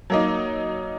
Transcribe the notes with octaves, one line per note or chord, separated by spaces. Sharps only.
F#3 A#3 D#4